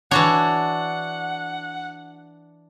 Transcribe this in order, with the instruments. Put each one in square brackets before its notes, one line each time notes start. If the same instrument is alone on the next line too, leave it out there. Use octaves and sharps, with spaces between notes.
[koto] E3 F#4 C#5 [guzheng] D4 [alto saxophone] F#5